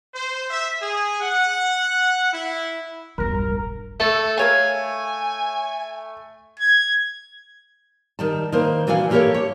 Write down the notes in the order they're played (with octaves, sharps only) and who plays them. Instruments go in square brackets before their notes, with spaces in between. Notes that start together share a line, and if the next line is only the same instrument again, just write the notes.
[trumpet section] C5
E5
G#4
F#5
E4
[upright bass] E1 B1 [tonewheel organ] G2 [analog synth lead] A#4
[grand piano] A3 [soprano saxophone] A4
[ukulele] A#4 C#5 F5 [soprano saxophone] G#5
[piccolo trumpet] G#6
[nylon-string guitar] D#3 G3 A5
D#3 A#3 B4 C5
A#2 E3 D4 F#4 F5 G#5
E3 A#3 G4 A4 A#4 C#5
C#5